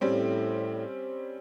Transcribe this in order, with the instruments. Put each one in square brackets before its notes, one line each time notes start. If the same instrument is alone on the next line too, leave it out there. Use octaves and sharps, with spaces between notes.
[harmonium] A2 [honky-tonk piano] G3 C4 C#4